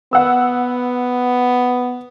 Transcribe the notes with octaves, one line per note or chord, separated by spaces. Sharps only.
B3 F#5 E6